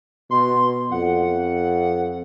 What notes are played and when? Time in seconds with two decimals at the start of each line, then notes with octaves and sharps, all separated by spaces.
0.31 B2 C6
0.91 F2 F#5